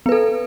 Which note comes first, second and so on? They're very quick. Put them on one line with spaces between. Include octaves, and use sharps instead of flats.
B3 B4 A4